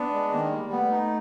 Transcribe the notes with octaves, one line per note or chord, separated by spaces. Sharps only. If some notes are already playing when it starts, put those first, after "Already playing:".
Already playing: B3 D4
G#3
D#3 A#3
G3
A3 B3
D#4